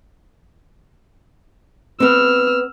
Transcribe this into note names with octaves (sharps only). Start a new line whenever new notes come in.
B3 C4 E6 F6